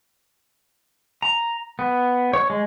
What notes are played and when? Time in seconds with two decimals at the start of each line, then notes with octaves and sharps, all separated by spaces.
1.22 A#5
1.79 B3
2.33 C#5
2.50 G#3